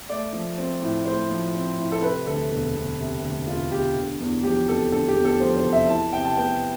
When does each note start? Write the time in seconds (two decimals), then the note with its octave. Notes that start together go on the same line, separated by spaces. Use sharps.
0.09 A3 D5
0.33 F3
0.58 C4
0.82 A2
1.05 A3 C5
1.29 F3
1.55 C4
1.78 A2
1.92 A4
2.02 C3 B4
2.27 D2 A4
2.51 E1
2.75 E1
2.99 C3
3.23 D2
3.47 E1 F4
3.71 E1 G4
3.96 D3
4.20 E2
4.43 F3 G4
4.67 F1 A4
4.92 D3 A4
5.08 G4
5.16 E2
5.25 A4
5.40 F3 C5
5.56 C5
5.65 F1
5.73 E5
5.89 E3 A5
6.13 C3 G5
6.25 A5
6.36 B3 G5